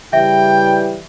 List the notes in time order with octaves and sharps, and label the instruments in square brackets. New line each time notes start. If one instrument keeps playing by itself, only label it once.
[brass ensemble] C#3 E3 G3 [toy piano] E5 [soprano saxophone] G5